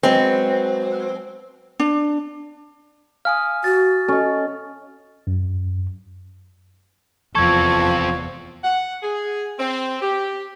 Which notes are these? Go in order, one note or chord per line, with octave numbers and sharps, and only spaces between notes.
F#3 G#3 B3 C4
D4
F5 G#5 D#6 F6
F#4 A6
C#4 A4 D#5
F#2
F1 E2 F3 C4 A4 C#6 G#6
F#5
G#4
C4
G4